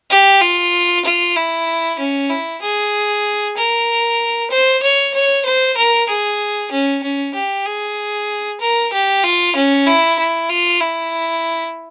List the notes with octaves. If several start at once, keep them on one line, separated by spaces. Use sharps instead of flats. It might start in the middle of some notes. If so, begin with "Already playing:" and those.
G4
F4
F4
E4
C#4
E4
G#4
A#4
C5
C#5
C#5
C5
A#4
G#4
C#4
C#4
G4
G#4
A#4
G4
F4
C#4
E4
E4
F4
E4